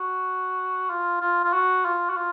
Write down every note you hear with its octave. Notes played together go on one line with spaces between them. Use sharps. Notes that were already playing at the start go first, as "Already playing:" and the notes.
Already playing: F#4
F4
F4
F4
F#4
F4
F#4
F4